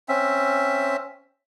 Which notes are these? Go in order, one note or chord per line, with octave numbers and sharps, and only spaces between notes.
C4 C#4 E5